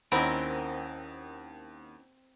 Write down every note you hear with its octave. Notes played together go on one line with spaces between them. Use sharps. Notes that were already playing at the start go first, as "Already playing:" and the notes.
D#2 C4 C#4 E4 A#4 D#5 F#5 B5